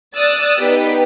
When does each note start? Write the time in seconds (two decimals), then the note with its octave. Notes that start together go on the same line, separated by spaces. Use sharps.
0.14 D5 D#6 E6 F#6 A6
0.57 B3 D#4 G4 B4